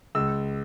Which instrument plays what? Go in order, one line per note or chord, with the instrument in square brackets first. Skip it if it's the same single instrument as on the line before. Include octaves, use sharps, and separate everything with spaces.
[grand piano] C#2 E6